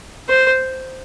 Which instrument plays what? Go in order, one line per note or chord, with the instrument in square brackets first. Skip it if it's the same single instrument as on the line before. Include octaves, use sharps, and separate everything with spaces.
[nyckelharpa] C5